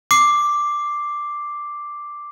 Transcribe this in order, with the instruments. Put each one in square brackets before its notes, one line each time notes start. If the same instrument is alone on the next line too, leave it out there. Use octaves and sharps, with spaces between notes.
[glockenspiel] D6 C7